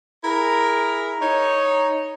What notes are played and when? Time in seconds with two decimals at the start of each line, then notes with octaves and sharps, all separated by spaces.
0.25 E4 G#4 A#4
1.21 D#4 C#5